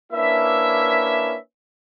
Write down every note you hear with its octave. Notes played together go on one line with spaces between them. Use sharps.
A#3 C#4 D4 E4 B4 E5